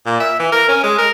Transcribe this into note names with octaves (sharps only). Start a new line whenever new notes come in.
A#2
E5
E3
A#4
C#4
G#3
A#4